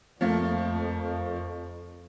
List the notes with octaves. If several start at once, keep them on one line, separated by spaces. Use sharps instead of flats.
F2 F3 A3 A#3